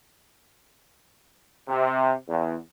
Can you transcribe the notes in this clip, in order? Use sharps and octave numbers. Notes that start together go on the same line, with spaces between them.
C3
E2